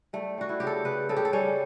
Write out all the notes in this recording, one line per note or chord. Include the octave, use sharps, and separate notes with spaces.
G3 A3
G3 F#4
E4
C#3 G4
A4
C#3 B4
C#3 A4
G4
A4
G3 C#4